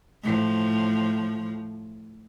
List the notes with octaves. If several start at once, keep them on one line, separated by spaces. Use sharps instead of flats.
A2 F3